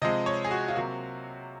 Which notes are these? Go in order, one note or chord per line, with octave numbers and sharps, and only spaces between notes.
C3 F3 G#3 D#5
C#5
G#4
F#4
F4
C3 F#3 A#3 F#4